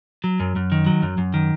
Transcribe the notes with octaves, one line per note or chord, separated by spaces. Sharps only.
F#3
F#2
F#2
D#3
F#3
F#2
F#2
D#3